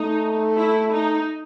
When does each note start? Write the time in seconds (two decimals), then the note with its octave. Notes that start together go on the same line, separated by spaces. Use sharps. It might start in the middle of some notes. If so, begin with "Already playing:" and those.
Already playing: A3 D#4
0.56 E4
0.93 D#4